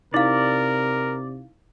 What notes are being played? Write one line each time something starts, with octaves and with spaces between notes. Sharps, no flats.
C3 D#4 E4 A#4 D5 F5